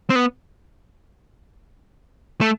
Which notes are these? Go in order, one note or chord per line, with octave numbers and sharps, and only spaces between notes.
C4
B3
A3